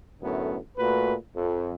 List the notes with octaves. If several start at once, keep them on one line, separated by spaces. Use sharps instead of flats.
F#2 A2 D3 A3 B3
A#2 A3 F#4 B4
F2